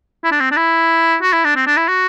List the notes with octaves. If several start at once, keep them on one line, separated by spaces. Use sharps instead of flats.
E4
D4
C4
D4
E4
F#4
E4
D4
C4
D4
E4
F#4